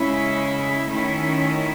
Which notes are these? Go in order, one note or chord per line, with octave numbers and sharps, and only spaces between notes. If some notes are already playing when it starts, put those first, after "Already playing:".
Already playing: C#3 G#3 C#4 E4
D#3 A3 C#4 E4